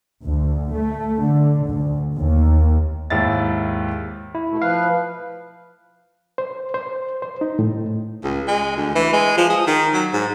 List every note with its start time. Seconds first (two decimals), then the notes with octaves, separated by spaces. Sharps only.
0.24 D2
0.75 A3
1.22 D3
1.69 D2
2.16 D#2
3.10 D#2 G#2 E4 A6
4.35 E4
4.49 B2 A3
4.62 F3 B4 F5
6.38 C5
6.74 C5
7.22 C5
7.41 D#4
7.59 A2
8.23 C#2
8.48 G#3
8.76 D2
8.95 E3
9.13 G#3
9.37 F3
9.50 G#4
9.67 D#3
9.94 F#3
10.13 G#2